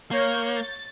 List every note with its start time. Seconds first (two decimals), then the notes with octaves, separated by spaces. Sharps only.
0.11 A#3 C#5 G6
0.56 A6